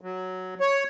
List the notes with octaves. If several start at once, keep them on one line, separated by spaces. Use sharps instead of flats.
F#3
C#5